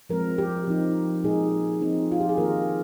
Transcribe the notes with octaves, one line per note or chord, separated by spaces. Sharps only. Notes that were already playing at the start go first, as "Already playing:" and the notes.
F3 G#3 C4 A#4
G4
F3 C4 D#4
A#2 G#3 D#4 G#4
F3 C4 D#4
F4
G4
G#4
D#3 A#3 D#4 A#4